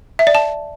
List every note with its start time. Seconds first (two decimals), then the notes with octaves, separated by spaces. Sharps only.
0.19 E5
0.27 D5
0.35 A5